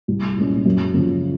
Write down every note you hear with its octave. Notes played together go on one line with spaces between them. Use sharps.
C2
A#2 G#3 C#4
F#2
C#3 F3